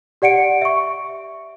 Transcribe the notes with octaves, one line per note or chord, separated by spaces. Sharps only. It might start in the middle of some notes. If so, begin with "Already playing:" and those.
G4 D5 F#5 C#7 D7
E5 C#6